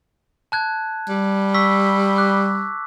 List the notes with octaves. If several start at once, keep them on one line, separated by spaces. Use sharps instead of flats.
A5 F#6 G#6
G3
C#6 E6 B6
D6 F#6